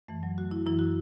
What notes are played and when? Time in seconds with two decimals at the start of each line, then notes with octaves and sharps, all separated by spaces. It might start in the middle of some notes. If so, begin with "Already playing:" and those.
0.08 F#2 E3 A3
0.23 F#3
0.38 F#4
0.51 E4
0.66 F#2 E3 E4
0.79 F#4